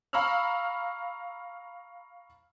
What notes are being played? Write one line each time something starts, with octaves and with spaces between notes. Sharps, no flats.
F5 A#5 B5 C#6 E6 F6